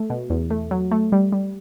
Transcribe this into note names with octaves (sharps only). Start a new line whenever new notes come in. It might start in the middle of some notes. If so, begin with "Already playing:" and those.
Already playing: A3
B2
E2
A3
F#3
A3
G3
G3